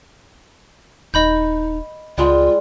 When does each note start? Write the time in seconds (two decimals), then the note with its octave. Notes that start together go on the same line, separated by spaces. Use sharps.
1.14 D#1 D#4 D#5 B5 G6
2.18 C#2 G3 G#3 F4